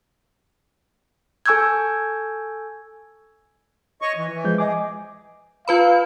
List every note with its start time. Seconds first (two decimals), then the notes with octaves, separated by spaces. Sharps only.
1.46 A4 G#5 C#6 E6 G6 G#6
4.02 C#5 D#5 C#6
4.17 E3
4.33 E3
4.44 F3 G#3 G6
4.58 G#4 D#5 G#5 D6
5.68 F4 B4 F5 B5